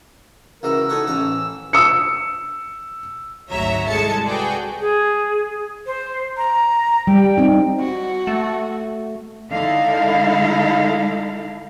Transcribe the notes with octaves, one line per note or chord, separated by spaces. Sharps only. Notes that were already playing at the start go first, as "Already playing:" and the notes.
C#2 E3 F#4 A#4 E6
D#4 A4 C#5 F#5
A1 E3 C#4 A#5
E6 C#7
G#1 D2 F#3 C#5 E5 A#5
C2 G#3 A4 A5 C#7
F#4 G#4 A4 B4 D5 G5
G#4
C5
A#5
G3 G5
C4 D#4
F#4
A3
D3 G#3 D#4 E4 A4 F5